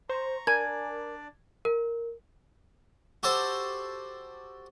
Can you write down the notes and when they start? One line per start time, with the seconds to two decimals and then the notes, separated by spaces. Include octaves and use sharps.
0.09 C5 A#5 C#6
0.47 D4 A#4 D5 G#5 G#6
1.65 A#4
3.23 F#4 G4 A4 C5